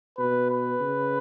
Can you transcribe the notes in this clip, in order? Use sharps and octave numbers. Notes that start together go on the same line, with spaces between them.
B2 B4
B4
C#3